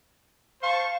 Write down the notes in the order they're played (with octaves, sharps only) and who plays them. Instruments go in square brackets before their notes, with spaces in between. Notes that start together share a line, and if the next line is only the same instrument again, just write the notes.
[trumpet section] C5 A5 C#6 [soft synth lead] F5